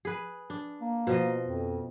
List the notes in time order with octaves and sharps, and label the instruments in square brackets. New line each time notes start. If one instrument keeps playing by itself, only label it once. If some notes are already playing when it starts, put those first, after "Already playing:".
[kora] G#4 B4
D4
[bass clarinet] A#3
[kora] B2 F3 D#5
[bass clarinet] F2